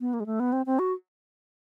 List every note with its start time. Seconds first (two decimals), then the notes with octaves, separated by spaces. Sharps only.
0.01 B3
0.14 A#3
0.20 G#3
0.26 A3
0.40 B3
0.53 C4
0.66 C4
0.79 F#4